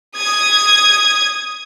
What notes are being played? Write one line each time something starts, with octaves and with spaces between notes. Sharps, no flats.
D#6 G#6